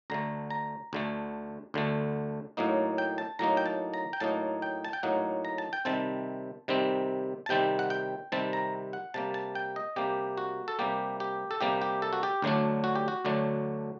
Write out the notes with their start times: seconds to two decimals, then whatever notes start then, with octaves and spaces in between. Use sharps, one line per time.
0.10 D2 D3 A3 A#5
0.50 A#5
0.93 D2 D3 A3
1.74 D2 D3 A3
2.57 A2 F#3 A#3 D#4
2.98 G5
3.18 A5
3.39 A2 F#3 A#3 D#4 A#5
3.57 G5
3.66 A5
3.94 A#5
4.13 G5
4.20 A2 F#3 A#3 D#4 A5
4.62 G5
4.85 A5
4.93 G5
5.03 A2 F#3 A#3 D#4 F#5
5.45 A#5
5.58 A5
5.73 G5
5.85 C3 D#3 G3 C4 A5
6.68 C3 D#3 G3 C4
7.46 A5
7.49 C3 D#3 G3 C4 G5
7.79 F#5
7.90 G5
8.32 C3 D#3 G3 C4 A5
8.53 A#5
8.93 F#5
9.14 C3 G3 A#3 A5
9.34 A5
9.55 G5
9.76 D#5
9.96 C3 G3 A#3 G4
10.38 F#4
10.68 A4
10.79 C3 G3 A#3 G4
11.20 G4
11.51 A4
11.61 C3 G3 A#3 G4
11.81 G4
12.02 A4
12.13 F#4
12.23 G4
12.42 D2 D3 F#3 A3 D4
12.84 F#4
12.95 G4
13.08 F#4
13.25 D2 D3 F#3 A3 D4